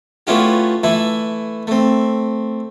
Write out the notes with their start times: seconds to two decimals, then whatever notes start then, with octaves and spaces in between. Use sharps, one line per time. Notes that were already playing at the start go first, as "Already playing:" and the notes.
0.27 A3 B3 C#4 E4 F4 G4
0.83 E3 A3 E4
1.67 A3 C4